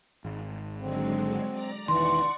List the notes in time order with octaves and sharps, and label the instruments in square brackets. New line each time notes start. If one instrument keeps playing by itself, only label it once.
[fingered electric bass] G#1
[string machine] D3 F#3 G#3 [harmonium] C4
[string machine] D5 A#5
[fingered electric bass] E1 A#1 D#3 [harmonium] E3 [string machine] D5 F#5 C#6 [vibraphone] C6